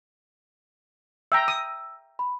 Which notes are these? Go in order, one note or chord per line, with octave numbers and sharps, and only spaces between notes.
E5 G5 A#5 E6
D#6
B5